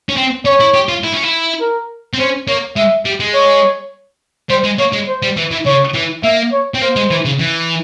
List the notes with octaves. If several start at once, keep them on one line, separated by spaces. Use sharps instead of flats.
C#4
C4
C#4 C#5
E4
G4
F4
E4
C#4
E4
A#4
C4
C#4 C5
A#3 C#5
G#3 E5
G3
G#3
C#5
G3 C5
G#3
A#3 C#5
G#3
C5
G3
E3
E3
C#3 C#5
E3
A#3 E5
C#5
C4
A#3 C5
G#3
E3
C#3
E3